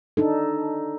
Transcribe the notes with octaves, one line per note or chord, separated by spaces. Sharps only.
D4 D#4 A4